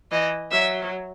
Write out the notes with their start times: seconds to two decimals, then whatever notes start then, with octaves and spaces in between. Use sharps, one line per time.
0.11 E3 D#5
0.51 F#3 E5